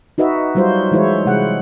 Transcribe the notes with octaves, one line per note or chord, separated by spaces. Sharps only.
D#4 F#4 B4 D#5 E5
F#3 G3 F4 F#4 C5
E3 G#3 E4 C5 C#5
C3 G#3 F#5